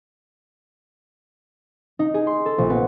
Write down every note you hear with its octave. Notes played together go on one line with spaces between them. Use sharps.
D#4
G#4
C6
A4
A#1
B3